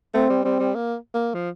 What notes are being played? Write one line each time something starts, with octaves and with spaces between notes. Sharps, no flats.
A3 C4
G3
G3 C4
G3
A#3
A#3
F3